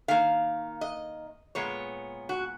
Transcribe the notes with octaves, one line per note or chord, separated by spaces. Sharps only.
D#3 A#3 F5
D#5
A#2 G#3 B3 C#5
F#4